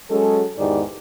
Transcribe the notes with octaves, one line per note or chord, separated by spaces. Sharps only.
F#3 G#3 C#4 G#4 A4
E2 G#2 D#3 E3 G4 D5